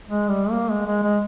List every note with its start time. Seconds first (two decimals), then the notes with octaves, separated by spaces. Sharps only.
0.08 G#3
0.28 G3
0.50 A#3
0.70 G#3
0.86 G#3
1.03 G#3